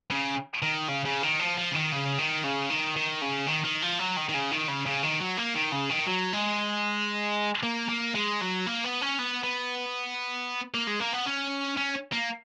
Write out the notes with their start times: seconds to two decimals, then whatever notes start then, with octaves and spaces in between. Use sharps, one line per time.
0.11 C#3
0.63 D#3
0.88 C#3
1.05 C#3
1.23 D#3
1.39 F3
1.58 F3
1.71 C#3
1.75 D#3
1.92 C#3
2.18 D#3
2.44 C#3
2.70 D#3
2.96 D#3
3.22 C#3
3.47 D#3
3.65 D#3
3.82 F3
3.99 F#3
4.17 D#3
4.29 D#3
4.34 C#3
4.51 D#3
4.68 C#3
4.86 C#3
5.03 D#3
5.20 F#3
5.38 A#3
5.55 D#3
5.72 C#3
5.89 D#3
6.06 F#3
6.33 G#3
7.63 A#3
7.89 A#3
8.15 G#3
8.41 F#3
8.66 A#3
8.84 B3
9.01 C#4
9.19 B3
9.44 B3
10.74 A#3
10.87 G#3
11.00 A#3
11.13 B3
11.26 C#4
11.77 C#4
12.12 A#3